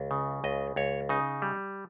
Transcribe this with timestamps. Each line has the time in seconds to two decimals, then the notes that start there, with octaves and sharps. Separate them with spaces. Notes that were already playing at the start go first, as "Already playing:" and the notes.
Already playing: C#2
0.11 C#3
0.44 C#2 D#5
0.76 C#2 C#5
1.09 C#3 D#4
1.42 G3